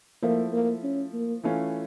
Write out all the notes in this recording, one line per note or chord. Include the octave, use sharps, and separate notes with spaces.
F3 A3 A#3 E4
A#3
C#4
A#3
E3 A3 C#4 F4